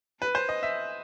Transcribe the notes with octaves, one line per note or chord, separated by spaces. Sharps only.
B4
C5
D#5
E5